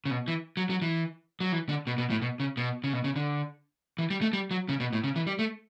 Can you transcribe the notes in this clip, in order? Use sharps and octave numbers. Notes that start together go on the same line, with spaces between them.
C#3
B2
E3
F#3
F#3
E3
F#3
E3
D3
B2
B2
A2
B2
C#3
B2
C#3
B2
C#3
D3
E3
G3
A3
G3
F#3
C#3
B2
A2
C#3
E3
G3
A3